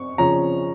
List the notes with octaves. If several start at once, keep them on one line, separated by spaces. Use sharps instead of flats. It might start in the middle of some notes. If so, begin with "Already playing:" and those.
Already playing: C#6
C#3 F3 C#4 A#5